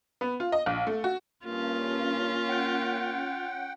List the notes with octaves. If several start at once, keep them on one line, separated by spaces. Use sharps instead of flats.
B3
F4
D#5
A#1
A3
F#4
G2 A#3 C#4 F4
F#5 G5